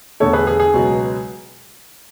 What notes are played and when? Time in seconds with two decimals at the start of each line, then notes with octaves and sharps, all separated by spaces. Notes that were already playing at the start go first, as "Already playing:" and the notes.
0.20 E2 D3 A3 A4 C#5
0.33 G#4 B4
0.47 G#4
0.60 G#4
0.74 C#2 B2 F#3 B3